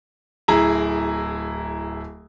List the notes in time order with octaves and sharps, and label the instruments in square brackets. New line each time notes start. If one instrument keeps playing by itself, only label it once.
[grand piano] D1 E4 G#4 A#5